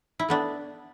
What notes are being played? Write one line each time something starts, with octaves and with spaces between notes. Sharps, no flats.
E4
A3 B3 D4